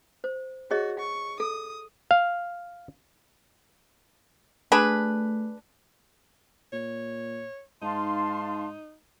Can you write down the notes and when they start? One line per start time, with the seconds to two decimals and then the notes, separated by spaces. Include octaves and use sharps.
0.24 C5
0.71 F#4 G#4 C#5 D#5
0.99 C#6
1.40 A4 D#6
2.11 F5
4.72 A3 D4 G#4 B4
6.73 A#2 C#5
7.82 G#2 D#4 F5 A5 C6